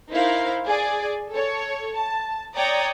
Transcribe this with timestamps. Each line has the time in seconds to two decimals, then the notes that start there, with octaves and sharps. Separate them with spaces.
0.12 D#4 E4 A#4 C5 F5
0.67 G#4 D5 G#5
1.31 A4 C#5
1.95 A5
2.55 C#5 D5 G5 A#5 D#6